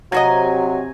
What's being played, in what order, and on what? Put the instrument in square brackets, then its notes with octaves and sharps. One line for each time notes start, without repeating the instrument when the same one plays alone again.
[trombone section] C3 [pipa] F3 F#4 D#5 [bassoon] F#3 [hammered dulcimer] G#5 A#5